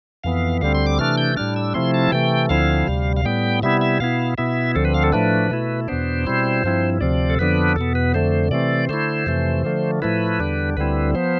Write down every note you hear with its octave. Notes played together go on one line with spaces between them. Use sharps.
F2 E3 B3 F5
D2 D3 G3 C4 F5
C6
D6
C3 E3 A3 D4 F6
G6
A2 G3 D4 F6
E6
C3 F3 A3 C4 E4 C6
A5
C3 E3 A3 G5
D2 D3 F3 C4 E4 F5
D2 C3 G3
F5
A2 G3 B3 G5
C3 G3 B3 E4 E5
E5
B2 B3 E4 F5
B2 B3 E4 E5
D2 D3 F3 C4 A4
B4
F5
A4
A2 F3 A3 D4 B4
B2 A3 E4
E2 B2 B3 D4 C5
B2 G3 C4 E4
G2 F3 C4 E4
D2 C3 F3 C4 D5
A4
F2 D3 F3 B3 D4 B4
E2 B2 B3 A4
B4
F2 D3 A3 C5
C3 E3 A3 C4 D5
D3 A3 E4 C5
F2 C3 E3 A3
D3 F3 A3
A2 F3 A3 E4 B4
E2 D3 G3 D4
D2 D3 G3 C4 E4 B4
F3 B3 C5